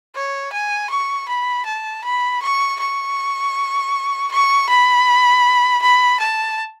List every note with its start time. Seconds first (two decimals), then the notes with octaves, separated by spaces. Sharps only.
0.15 C#5
0.52 G#5
0.90 C#6
1.28 B5
1.65 A5
2.04 B5
2.42 C#6
2.80 C#6
4.31 C#6
4.69 B5
5.82 B5
6.20 A5